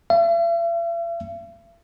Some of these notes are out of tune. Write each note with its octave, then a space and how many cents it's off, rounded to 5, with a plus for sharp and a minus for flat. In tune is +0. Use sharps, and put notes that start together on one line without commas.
E5 +45